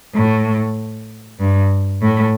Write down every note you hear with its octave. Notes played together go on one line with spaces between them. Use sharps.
A2
G2
A2